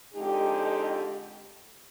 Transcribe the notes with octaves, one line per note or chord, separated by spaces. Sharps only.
F2 D3 G#3 D#4 G4